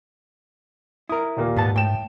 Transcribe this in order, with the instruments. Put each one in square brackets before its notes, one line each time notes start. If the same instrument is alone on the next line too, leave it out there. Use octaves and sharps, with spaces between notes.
[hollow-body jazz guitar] E4 A#4 [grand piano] D#6
[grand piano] D#2 A#2 A#3
[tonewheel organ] G#2 [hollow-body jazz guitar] B2 B3 A5
[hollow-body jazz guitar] A2 [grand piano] G5 A5 E7